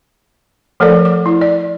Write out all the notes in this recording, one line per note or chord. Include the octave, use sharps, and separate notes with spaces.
F3 A3 A4 A#4 C5 D5
D6
E4
D5